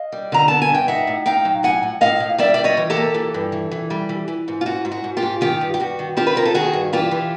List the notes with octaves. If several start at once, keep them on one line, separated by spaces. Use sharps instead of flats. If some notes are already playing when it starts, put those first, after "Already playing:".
Already playing: D#5 F5
G3
D3 A#5
B3 A5
G#5
G2
G5
D#4 E5 F#5
A2
D#4 F5 G5
F#3
A2 F#5 G#5
A2
A2 D#5 F5
A2
G3 D5 E5
G3 D5
C#5 D#5
E3
G4 A4
A#3
E3
G2
E3
E3
G3
E3
E3
G#2
F4
G#2 F#4
G#2
F#4
G#2
F4 G4
G#2
D#3 F4 G4
G2
G4
G2 F#4
D#3
C4 F4 G4
B4
D#3 A#4
A4
D#3 F#4 G#4
G2
E3 F4 G4
E3